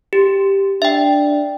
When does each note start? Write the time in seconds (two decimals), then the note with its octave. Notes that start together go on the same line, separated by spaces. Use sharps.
0.13 G4
0.82 D4 E5 G5